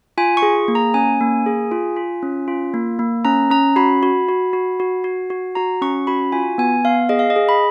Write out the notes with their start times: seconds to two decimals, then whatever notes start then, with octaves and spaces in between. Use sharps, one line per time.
0.18 F4 G#5
0.37 C#6
0.42 G#4
0.68 A#3
0.75 A#5
0.94 C#4 G#5
1.21 A#3
1.46 G#4
1.71 F4
1.96 F4
2.23 C#4
2.48 F4
2.74 A#3
2.99 A#3
3.25 C#4 A#5
3.50 C#4 A#5
3.76 F#4 B5
4.03 F#4
4.28 F#4
4.53 F#4
4.80 F#4
5.04 F#4
5.30 F#4
5.55 F#4 A#5
5.81 C#4 C#6
6.07 F#4 B5
6.32 F4 G#5
6.58 B3 G#5
6.84 B3 F5
7.09 G#4 D#5
7.19 F5
7.30 D#5
7.36 G#4
7.49 B5